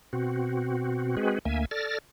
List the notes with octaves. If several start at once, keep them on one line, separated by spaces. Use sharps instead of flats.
B2 C4 F#4
G#3 C4 F#4 G#4 B4
D2 A#3 E5 G#5
A4 D5 F6 A6 A#6